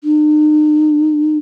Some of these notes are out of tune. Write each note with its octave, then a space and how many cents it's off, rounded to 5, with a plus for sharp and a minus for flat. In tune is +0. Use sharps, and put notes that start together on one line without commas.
D#4 -45